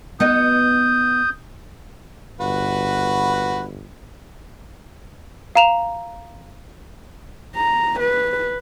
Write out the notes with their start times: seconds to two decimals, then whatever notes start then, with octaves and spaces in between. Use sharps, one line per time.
0.20 B3 D#4 F#4 D#6 G6
2.40 G1 F#4 B4
5.55 F5 A#5 E7 F7
7.56 A#5
8.00 B4